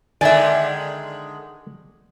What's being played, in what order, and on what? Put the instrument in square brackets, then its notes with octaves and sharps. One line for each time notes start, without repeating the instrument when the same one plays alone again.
[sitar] D3 D#3 G#3 [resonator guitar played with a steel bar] D5 E5 [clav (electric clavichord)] G#5